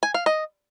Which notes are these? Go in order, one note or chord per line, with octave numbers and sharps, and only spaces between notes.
G#5
F5
D#5